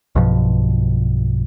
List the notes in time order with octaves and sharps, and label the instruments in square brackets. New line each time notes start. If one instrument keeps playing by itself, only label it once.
[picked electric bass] B1 G2 B2 F3